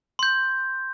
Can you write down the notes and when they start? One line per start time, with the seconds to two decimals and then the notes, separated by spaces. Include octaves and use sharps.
0.19 C6 G6